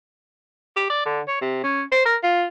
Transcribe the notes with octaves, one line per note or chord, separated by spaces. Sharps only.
G4
D5
D3
C#5
C3
C#4
C5
A#4
F4